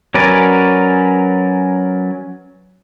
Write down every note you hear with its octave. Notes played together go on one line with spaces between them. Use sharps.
F#3 C#4 A#4 B4 D5